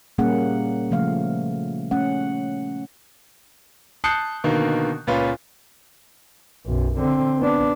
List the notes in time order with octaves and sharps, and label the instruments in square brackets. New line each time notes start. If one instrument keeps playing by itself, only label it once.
[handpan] A#2 G3 A#3 C#4 G#4 F#5
C#3 F3 A3 F5
A3 C#4 F#5
[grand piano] A5 D#6 F#6 G6 C7 C#7
B2 D3 D#3 A#3
C#2 A#2 C#4 F4 B4
[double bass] B1 F#2
D3 C4
B3 D4